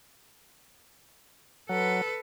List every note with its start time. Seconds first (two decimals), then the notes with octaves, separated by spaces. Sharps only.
1.69 F#3 A4 B4